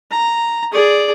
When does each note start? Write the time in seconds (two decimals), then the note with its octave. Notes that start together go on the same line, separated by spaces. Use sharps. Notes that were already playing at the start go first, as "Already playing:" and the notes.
0.11 A#5
0.72 G#4 D5